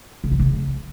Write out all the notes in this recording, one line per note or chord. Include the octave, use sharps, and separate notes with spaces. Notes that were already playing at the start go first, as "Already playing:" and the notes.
C#3
F#3
C#3